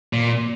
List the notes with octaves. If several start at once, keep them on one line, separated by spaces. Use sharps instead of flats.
A#2